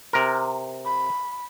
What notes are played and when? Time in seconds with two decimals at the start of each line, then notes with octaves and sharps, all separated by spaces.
0.13 C3 A#4
0.85 B5